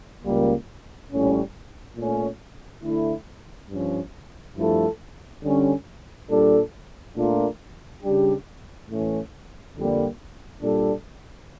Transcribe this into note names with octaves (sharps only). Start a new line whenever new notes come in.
C#2 C#3 G3 A#3
A#1 A2 G3 C#4
A#2 A3 C#4
D3 A3 E4
G2 F3 C#4
G2 F3 A3 E4 A4
D3 G3 C#4
A#2 G3 D4 A4
A#2 A3 D4 F4 A#4
C#3 G3 D4 G4
A2 E3 A3 C#4
F2 D3 G3 A#3
A#2 G3 D4 A4